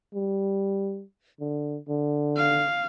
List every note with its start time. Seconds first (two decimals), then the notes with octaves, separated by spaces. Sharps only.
0.15 G3
1.40 D3
1.89 D3
2.37 F5